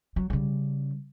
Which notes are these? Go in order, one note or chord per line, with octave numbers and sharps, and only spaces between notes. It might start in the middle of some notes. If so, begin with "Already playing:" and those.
F#3
C#3 G3